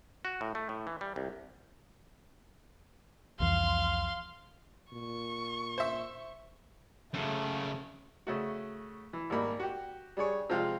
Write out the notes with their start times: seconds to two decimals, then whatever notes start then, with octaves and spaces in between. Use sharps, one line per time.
0.25 F#4
0.41 A2
0.55 A3
0.69 A2
0.87 E3
1.01 G3
1.16 C2
3.40 C2 F2 E3 F5 C6
4.92 A#2 C#6
5.78 C5 E5
7.14 F#2 C#3 A3
8.27 C#3 A3 F#4
9.13 E3
9.30 G#1 G3 A#3 B5
9.60 F#4 G4
10.17 G3 D4 G#4 C#5
10.50 C3 F3 G#3 F4 G4